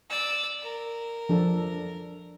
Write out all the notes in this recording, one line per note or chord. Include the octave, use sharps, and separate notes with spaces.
D5 E6
A#4
F3 D4 A4